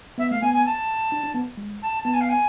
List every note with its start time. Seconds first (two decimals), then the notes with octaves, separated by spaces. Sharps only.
0.18 B3 E5
0.30 A3 F5
0.41 B3 G#5
0.53 G#5
0.65 A5
1.12 D4
1.24 D4
1.34 B3
1.57 G#3
1.82 A5
2.04 B3 A5
2.13 G#5
2.20 F5
2.29 G#5